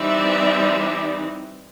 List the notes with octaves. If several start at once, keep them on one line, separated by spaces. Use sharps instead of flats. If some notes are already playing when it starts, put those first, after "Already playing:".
Already playing: E3 G3 C4 D#4 D5 E5